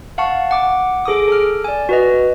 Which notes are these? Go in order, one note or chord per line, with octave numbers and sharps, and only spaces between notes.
F5 F#5 A5 C#6
F#5 D6
G#4 A4 D6 D#6
A4 F6
D5 G#5
F#4 B4 D#5